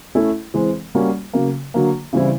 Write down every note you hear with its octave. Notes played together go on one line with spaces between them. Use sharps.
A3 C#4 E4 A4
E3 G#3 C4
G3 A#3 C#4 F#4
C#3 F#3 A#3
D3 F#3 A#3
C#3 E3 G3 C4 E4